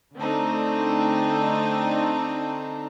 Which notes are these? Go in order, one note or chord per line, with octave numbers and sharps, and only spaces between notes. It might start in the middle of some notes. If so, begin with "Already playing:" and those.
D3 A3 C4 D4 D#4